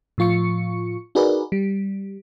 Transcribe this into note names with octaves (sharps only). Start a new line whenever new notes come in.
A2 F3 F4 C#6 C#7
D#4 F#4 G#4 A#4 B4 D5
G3